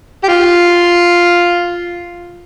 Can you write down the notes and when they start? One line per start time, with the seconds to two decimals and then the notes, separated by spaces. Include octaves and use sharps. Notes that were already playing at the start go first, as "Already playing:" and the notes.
0.24 G4
0.28 F4